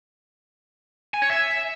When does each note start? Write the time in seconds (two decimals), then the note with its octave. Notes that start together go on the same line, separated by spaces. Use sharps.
1.14 G#5
1.22 C#5
1.30 E5